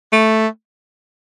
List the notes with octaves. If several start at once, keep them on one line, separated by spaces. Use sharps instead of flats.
A3